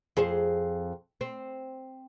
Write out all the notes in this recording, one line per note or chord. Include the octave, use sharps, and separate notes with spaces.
F2 G#4 C5
C4